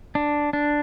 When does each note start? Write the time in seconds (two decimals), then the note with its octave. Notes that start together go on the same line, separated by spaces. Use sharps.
0.15 D4
0.53 D4